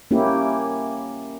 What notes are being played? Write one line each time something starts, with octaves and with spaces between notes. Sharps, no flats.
A#3 C#4 E4 G4